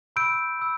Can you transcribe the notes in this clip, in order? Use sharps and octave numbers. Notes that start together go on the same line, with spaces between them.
B5 E6 G6 D7
B5 E6 G6